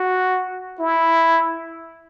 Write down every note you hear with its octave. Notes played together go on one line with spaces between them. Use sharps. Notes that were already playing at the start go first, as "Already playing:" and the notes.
Already playing: F#4
E4